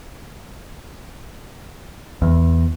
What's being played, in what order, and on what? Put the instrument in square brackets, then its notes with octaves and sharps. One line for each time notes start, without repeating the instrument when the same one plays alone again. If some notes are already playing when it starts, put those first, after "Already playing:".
[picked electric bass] E2